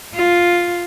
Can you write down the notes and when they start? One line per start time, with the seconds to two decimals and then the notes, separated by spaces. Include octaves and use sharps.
0.15 F4